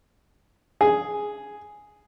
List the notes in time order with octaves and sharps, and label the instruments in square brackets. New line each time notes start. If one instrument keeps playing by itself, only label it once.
[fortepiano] G#4